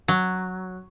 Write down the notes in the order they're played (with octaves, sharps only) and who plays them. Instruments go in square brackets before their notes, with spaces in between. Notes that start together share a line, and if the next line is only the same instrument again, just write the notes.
[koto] F#3